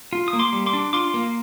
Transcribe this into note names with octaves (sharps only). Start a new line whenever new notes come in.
F4
D#6
A#3
C6 D6
G3
C6 D6
D4
F4 C6 D6
A#3